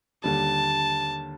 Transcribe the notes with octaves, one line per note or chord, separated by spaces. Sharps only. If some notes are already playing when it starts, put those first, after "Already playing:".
D#2 D3 G3 A5